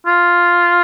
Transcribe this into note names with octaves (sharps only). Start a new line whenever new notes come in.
F4